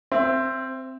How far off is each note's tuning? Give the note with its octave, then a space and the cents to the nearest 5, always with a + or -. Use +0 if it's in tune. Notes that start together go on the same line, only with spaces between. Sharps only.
C4 +0 E5 +20